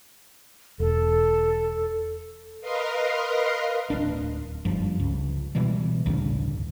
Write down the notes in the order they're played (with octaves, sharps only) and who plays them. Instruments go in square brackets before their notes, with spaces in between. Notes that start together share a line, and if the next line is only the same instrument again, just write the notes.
[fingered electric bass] E1 [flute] A4
[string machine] A#4 B4 D#5 F5 C6
[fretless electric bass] D1 G#1 D4
F#1 G2 F3
C#2
B2 E3 G3 G#3
A1 D2 G2 C#3